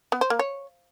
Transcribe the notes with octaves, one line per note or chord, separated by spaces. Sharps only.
B3
C5
A#3
C#5